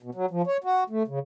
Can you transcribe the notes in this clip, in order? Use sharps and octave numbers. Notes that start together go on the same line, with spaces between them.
B2
F#3
F3
C#5
F#4
A3
C#3